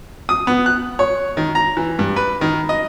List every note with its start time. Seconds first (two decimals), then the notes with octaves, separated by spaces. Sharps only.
0.29 D#6
0.47 B3
0.66 F#6
0.99 C#5
1.37 D#3
1.55 A#5
1.77 E3
1.99 G2
2.16 B4
2.41 D#3
2.69 D#5